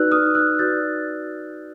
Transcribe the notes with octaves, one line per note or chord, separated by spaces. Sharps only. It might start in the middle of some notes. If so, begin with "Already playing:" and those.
Already playing: D#4 F#4 B4 D5 E6 F#6
D#6 F6
E6 F#6
D#4 F#4 B4 D5 G6 A6